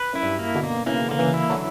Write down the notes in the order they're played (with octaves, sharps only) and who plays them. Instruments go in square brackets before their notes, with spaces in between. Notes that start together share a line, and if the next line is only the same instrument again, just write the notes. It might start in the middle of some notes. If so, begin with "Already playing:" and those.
Already playing: [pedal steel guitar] B4
[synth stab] F#2 [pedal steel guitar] E4
[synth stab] G2
[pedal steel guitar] A#3
[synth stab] B2 D3
[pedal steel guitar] A#3
[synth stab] C#3 E3 [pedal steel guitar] A#3
[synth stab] D3 [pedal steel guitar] A#3
[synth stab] C#3 E3
[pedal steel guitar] E4
[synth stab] D3 F#3